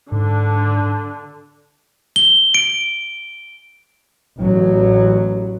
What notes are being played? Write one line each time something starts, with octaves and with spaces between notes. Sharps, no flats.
G#2 D3 D4
G7
D7
A1 F#3